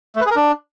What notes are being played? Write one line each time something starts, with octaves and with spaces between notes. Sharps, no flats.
A3
B4
G#4
A#4
D4